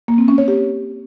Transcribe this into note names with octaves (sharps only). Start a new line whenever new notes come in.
A#3
C4
C#4
C#5
G4